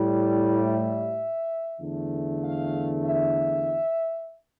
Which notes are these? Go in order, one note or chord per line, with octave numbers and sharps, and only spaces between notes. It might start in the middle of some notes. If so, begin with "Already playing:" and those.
Already playing: A2 G3
E5
E2 D3 A3
F5
E5